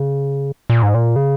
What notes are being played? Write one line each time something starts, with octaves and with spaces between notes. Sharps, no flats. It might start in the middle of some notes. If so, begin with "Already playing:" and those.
Already playing: C#3
A#2
G#2
A#2
C#3